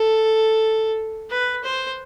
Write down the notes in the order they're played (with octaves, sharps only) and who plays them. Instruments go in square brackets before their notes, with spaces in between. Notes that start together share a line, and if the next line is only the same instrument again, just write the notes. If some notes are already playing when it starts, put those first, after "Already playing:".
Already playing: [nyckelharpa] A4
B4
C5